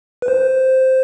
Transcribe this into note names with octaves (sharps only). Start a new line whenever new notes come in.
B4
C5